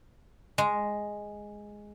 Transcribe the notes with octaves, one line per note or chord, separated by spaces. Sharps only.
G#3